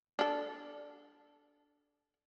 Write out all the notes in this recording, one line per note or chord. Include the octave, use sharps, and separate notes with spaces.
D4 A4